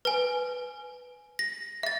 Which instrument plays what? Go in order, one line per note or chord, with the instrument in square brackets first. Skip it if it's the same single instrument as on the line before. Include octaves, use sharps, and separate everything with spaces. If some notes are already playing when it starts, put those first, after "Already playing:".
[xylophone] B4 G#5
A#6
E5 A6